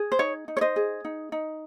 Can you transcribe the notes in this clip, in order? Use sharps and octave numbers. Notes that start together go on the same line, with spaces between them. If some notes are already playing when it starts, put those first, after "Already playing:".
Already playing: G#4
C5
D#4 C#5
D#4
C#5
C5 D#5
G#4
D#4
D#4